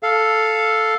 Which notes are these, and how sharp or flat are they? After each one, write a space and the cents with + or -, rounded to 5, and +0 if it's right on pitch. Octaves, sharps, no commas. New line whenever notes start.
A4 +0 F5 +0